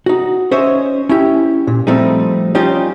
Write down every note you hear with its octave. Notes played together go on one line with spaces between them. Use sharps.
D#4 F#4
C#4 C5 C#5 D#5 E5
C#4 E4 G4
A#2
F3 G3 A3 C4 D#4
G3 C#4 D#4 F4 G4